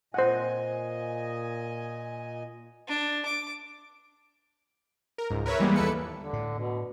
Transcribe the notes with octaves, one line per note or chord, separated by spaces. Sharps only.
A#2 C5 D#5 F#5 G#5
D4
D6
A#4
C#2 G#2
A#4 B4 C#5 E5
E3 G3 G#3 A#3 B3
D#2 E4 A4 B4 C#7
D3
A2
B2